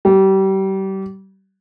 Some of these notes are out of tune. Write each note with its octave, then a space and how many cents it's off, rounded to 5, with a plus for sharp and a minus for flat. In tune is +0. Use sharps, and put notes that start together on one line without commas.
G3 -30